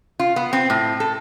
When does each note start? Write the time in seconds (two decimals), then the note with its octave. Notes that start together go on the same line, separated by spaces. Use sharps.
0.20 F4
0.36 B3
0.53 C4
0.70 A2
1.00 A4